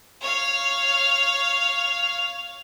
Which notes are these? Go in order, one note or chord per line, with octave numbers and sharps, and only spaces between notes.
C#5 F5